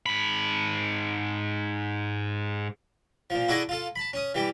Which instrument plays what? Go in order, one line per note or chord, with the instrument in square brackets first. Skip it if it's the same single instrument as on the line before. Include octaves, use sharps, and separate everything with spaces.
[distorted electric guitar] G#2 B5
[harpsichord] A#2 F3
E4 F#4 G#4 A4 D5 D#5
F4 A4
A5 B5
C#4 D#6
E3 G3 G4